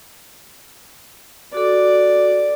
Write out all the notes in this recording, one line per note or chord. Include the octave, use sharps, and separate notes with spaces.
F#4 A4 D5